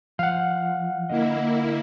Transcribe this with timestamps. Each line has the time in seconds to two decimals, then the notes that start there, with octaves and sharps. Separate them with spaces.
0.19 F3 F5 F#5
1.10 D3 A#3 E4 D#5